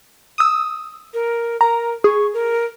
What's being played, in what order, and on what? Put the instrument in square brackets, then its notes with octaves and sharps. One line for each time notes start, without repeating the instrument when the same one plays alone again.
[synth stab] D#6 E6
[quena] A#4
[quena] A#4 [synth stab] A#5
[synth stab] G#4 [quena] C#6
[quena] A#4